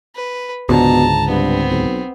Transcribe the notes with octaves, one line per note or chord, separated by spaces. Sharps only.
B4
C#2 G#2 B2 D3 A5 A#5
G2 B3 C4
B1